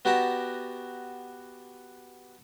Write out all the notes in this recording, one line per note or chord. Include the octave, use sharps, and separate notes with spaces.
B3 F#4 G4 D5 A5 A#5